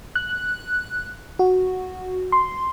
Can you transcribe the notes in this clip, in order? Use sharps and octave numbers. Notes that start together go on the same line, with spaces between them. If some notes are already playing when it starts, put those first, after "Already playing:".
F#6
F#4
C6